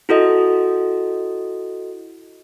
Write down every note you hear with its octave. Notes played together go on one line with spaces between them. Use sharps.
E4 F#4 A4 D#5